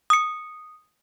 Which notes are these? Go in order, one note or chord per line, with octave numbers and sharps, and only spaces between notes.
D#6 C#7